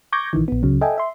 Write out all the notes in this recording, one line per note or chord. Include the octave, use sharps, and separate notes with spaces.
C#6 D6 G6 G#6 A#6
A#1 D#3 E3
A#1 B3
C#2 C#3 F#3
A4 D#5 E5 G5 G#5
E5 C6